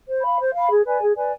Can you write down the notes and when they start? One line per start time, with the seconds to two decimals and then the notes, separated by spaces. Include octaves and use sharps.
0.07 C5
0.22 F5 B5
0.38 C5
0.53 F5 B5
0.70 G#4
0.85 B4 D5 G#5
1.00 G#4
1.15 B4 D5 G#5